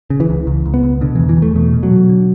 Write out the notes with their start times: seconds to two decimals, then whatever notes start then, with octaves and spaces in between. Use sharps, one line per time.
0.10 C#3
0.20 E3
0.30 C#2
0.47 C#2
0.66 C#2
0.74 B3
0.83 C#2
1.01 B2 D3
1.15 E3
1.20 E2
1.29 E3
1.37 E2
1.42 A3
1.56 B2 A3
1.73 B2
1.83 F#3
1.92 B2
2.09 D3